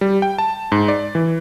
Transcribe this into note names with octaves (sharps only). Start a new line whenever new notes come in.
G3
G5
A5
G#2
D5
E3